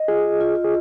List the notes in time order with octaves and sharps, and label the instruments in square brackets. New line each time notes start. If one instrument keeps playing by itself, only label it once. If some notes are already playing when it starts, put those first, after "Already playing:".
Already playing: [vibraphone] D#5
[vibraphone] F4 [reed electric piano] G#4
[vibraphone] F4
[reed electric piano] G#4